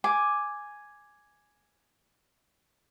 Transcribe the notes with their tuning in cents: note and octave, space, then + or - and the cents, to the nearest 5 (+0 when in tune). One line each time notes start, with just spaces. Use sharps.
G#5 +0 D6 +0